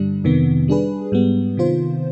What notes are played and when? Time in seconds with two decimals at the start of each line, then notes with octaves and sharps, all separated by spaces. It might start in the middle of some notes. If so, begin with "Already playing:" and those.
Already playing: G2 D3 G3 D4
0.24 F2 C3 D#3 B3
0.68 G3 D4 G#4 B4
1.12 G#2 G3 B3
1.57 C3 D#3 B3 F4 C5